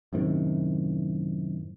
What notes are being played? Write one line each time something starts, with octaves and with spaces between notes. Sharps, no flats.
F#2 A2 C3 D#3